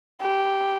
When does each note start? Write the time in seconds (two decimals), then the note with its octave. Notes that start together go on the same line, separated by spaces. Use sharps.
0.21 G4